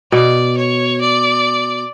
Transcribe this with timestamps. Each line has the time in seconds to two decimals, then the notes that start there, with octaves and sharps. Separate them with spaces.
0.12 B2 D5
0.57 C#5
1.01 D5